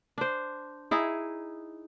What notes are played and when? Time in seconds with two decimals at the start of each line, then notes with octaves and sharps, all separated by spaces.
0.18 D4 C5
0.91 D#4 E4 G#4